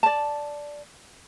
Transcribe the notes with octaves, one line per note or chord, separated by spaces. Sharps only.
D5 A5